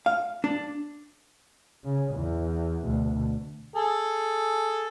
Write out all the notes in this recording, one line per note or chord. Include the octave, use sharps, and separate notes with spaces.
F5
D4
C#3
E2
D2 B2
G#4 A4